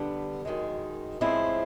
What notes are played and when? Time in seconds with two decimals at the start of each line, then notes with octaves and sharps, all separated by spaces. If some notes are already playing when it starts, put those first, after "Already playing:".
Already playing: D3 G3 B3 D4
0.45 F#2 D#3 G#3
1.21 A2 F3 G#3 C4 E4